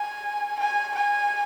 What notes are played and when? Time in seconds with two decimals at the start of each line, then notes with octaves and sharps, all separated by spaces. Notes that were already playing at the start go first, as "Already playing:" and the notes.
Already playing: G#5
0.59 G#5
0.95 G#5